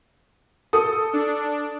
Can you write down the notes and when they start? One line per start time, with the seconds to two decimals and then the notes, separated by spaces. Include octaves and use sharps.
0.73 A4 D#6
1.13 D4